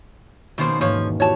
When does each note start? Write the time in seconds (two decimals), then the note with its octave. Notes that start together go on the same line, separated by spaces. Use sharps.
0.58 B2 D#3 F3 A#3 C#4 C5
0.81 E1 G#2 F3 A#3 C#5
1.20 E4 F#4 G4 C#5 A5